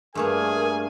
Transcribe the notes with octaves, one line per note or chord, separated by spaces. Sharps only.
G2 A3 A#3 G#4 A#4 G#5